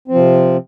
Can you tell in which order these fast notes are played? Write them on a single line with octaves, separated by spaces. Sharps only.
C4 F3 C3